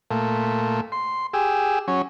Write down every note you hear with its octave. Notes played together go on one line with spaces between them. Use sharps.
A#2 A3
C6
G4 G#4 E6
F#3 C#4